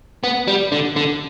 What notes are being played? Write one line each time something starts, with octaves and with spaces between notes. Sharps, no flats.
B3
G3
D3
D3